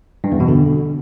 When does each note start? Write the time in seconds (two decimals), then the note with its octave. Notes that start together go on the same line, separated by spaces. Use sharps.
0.24 G2
0.32 E2
0.40 B2
0.48 D3